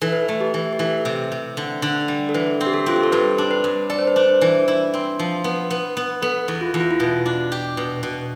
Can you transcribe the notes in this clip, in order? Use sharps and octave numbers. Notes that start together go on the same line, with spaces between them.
E3 A4
B4
A4
A3
G4
E3
G4
E3 A4
C3
C3
D3
D3
G3
A4
E3 B4
C4
G4
A4
C4 F4
G4
A4
G2 B4
D4
B4
G2
A4 D5
C5
B4
D4 C5
E3
E4
C4
F3
B3
B3
B3
B3 A4
E2
F4
E2
F4
E4
B2 F4
D4
G4
B2
B2